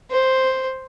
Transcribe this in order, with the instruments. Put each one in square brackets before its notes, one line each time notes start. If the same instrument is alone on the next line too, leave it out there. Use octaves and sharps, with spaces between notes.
[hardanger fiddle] C5